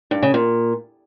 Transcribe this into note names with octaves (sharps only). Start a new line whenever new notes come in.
G2
C#3
A#2